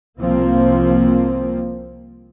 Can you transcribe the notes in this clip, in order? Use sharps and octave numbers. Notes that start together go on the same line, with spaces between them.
C2 F3 A#3 C4